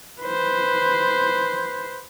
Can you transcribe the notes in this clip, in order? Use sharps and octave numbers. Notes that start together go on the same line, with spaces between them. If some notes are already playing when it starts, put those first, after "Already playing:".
B4 C5